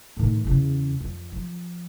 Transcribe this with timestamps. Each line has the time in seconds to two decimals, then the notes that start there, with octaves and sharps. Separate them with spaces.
0.17 A2 D#3
0.44 E2 C#3
1.00 F2
1.32 F3